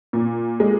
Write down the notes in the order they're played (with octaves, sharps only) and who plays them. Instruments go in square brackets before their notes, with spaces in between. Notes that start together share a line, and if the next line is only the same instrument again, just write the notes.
[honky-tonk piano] A#2
G#3